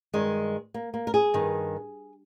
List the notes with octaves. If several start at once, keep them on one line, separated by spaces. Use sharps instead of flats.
G2 D#3 G#3
A#3
A#3
A#4
G#4
G2 D#3